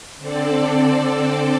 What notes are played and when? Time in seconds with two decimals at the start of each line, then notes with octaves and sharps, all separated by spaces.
0.17 D3 C4 A4 D5